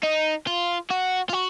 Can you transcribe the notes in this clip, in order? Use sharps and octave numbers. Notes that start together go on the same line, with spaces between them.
D#4
F4
F#4
F4
F#4